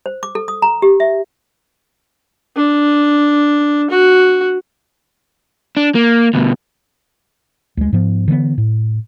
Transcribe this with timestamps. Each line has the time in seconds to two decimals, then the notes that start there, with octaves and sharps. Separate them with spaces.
0.06 C5
0.23 D6
0.35 A4
0.48 D#6
0.62 A#5
0.82 G4
1.00 E5
2.56 D4
3.91 F#4
5.77 D4
5.95 A#3
6.34 D2 B2
7.77 D2 G#3
7.93 G#2 F3 B3
8.28 D3 E3 A3 B3
8.58 A2